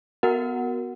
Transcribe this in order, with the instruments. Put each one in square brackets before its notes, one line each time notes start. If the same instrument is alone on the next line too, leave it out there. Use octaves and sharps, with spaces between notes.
[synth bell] B3 F#4 A#4 F#5